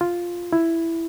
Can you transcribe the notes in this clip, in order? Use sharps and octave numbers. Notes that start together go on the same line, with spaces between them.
F4
E4